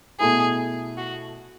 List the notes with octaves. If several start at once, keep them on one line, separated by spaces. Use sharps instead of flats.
B2 A3 E4 G#4
F#4